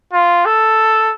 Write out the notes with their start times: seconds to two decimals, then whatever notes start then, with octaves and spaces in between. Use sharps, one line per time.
0.13 F4
0.45 A4